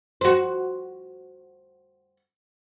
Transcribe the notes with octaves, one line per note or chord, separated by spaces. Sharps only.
F#4 C5